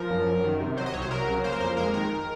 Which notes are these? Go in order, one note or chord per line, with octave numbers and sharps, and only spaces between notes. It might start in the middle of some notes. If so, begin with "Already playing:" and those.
Already playing: F3 A#4
F#2
F#2
D#3
C3
F#3 C5
D#5
C2 C#5
C5
F#3 A#4
C#3
A#3 C5
A#4
F2 C5
G#3 A#4
D#3 A#4